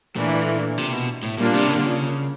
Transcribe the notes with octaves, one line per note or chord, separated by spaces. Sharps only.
A#2 E3 A3 D4
C3
B2
A2
A#2 G3 A#3 D4 F4
C3
C#3
D3
C#3